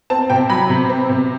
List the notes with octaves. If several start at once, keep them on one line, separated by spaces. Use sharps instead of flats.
C4 A5
C3 G5
F#3 B5
C3
C4
C3